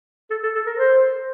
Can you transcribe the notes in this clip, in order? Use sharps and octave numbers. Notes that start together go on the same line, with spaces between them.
A4
A4
A4
A#4
C5